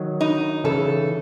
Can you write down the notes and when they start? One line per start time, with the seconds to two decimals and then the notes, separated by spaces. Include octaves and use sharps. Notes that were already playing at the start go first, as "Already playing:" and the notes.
Already playing: D#3 F#3
0.21 D#4
0.64 C#3 E3 A4